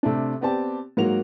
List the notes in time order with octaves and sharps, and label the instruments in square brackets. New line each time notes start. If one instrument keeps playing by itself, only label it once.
[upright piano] C3 A3 D4
B3 C4 G4 D5 A5
G#2 F#3 A#3 F#4 F7